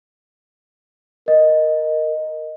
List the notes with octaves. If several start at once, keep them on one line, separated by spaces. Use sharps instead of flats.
A#4 D#5